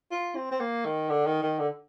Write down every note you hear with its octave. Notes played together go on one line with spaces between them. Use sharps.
F4
C4
C4
A#3
D#3
D3
D#3
D#3
D3